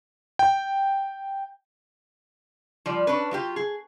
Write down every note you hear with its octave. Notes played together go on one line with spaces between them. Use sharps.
G5
F3 G3 D5
C#4 D4 B4
F#3 F4 G4
G#4